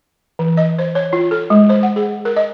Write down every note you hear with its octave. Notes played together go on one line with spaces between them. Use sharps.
E3
D#5
C5
C#5
F4
A4
G#3
C5
F#5
G#4
A#4
D#5